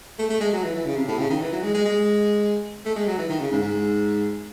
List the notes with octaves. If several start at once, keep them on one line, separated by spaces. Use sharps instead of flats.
A3
A3
G#3
F#3
E3
E3
C#3
C3
A2
C#3
D#3
E3
F#3
G#3
G#3
G#3
A3
G#3
F#3
E3
D#3
C#3
G#2
G#2